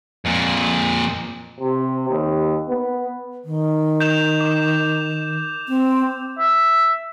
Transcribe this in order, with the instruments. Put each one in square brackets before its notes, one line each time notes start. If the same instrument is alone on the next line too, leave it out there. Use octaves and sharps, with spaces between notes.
[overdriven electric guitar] F2 A#2
[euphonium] C3
D#2
B3
[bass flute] D#3
[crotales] G6 E7 F7
D6
[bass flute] C4
[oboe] E5